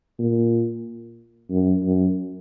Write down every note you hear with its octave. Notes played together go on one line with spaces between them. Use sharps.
A#2
F#2
F#2